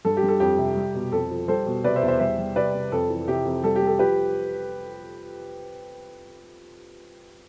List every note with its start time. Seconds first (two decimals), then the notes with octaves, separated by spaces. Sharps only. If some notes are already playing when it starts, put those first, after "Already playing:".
0.05 G2 A4
0.17 G4
0.23 G2
0.28 A4
0.40 F2 G4
0.58 C3
0.76 G3
0.94 B2
1.12 F2 A4
1.31 F3
1.48 G3 A4 C5
1.66 B2
1.84 C3 B4 D5
1.96 C5 E5
2.02 E2
2.08 C5 E5
2.20 G3 C5 E5
2.38 G3
2.56 C3 B4 D5
2.74 C3
2.92 F2 A4
3.10 E3
3.28 C3 G4
3.45 F2
3.64 G3 A4
3.76 G4
3.82 G3
3.87 A4
3.99 F3 G4 B4